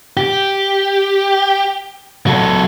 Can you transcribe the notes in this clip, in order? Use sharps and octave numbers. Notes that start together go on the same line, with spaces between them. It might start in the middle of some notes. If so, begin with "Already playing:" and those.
G4
F#3 A4